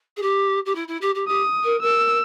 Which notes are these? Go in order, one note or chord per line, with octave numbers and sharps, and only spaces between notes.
G#4
G4
G4
E4
E4
G4
G4
G4 D#6
A#4
A#4 E6